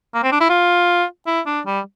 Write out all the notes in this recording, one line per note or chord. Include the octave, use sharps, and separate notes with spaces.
A#3
C4
D4
E4
F4
E4
D4
G3